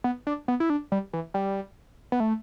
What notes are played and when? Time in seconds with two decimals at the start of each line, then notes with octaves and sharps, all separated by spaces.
0.04 B3
0.27 D4
0.48 B3
0.60 E4
0.70 D4
0.92 G3
1.13 E3
1.34 G3
2.12 B3
2.20 A3